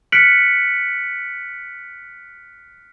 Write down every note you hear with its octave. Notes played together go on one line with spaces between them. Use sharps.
F6 F#6 B6 C#7 D7 F#7